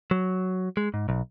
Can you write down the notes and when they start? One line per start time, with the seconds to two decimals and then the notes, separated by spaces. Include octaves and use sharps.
0.11 F#3
0.77 G#3
0.94 G#2
1.09 B1